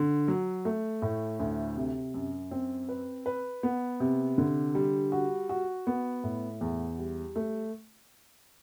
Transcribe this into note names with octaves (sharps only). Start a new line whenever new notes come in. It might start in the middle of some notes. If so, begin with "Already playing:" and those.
Already playing: D3
F#3
A3
A2
D2
C3
F#2
C4
B4
B4
B3
C3
D3
G3
F#4
F#4
B3
A2
E2
G3
A3